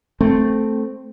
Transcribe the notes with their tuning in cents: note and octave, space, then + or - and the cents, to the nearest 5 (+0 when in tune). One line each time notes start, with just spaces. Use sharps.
A3 +0 C4 +0